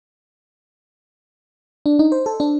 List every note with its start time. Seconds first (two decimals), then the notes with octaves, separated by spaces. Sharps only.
1.86 D4
1.99 D#4
2.12 C5
2.26 A4
2.40 D4